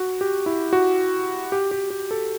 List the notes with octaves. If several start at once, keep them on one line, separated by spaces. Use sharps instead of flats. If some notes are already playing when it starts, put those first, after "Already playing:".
Already playing: F#4
G4
E4
F#4
G4
G4
G4
A4